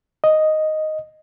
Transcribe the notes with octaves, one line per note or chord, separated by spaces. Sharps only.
D#5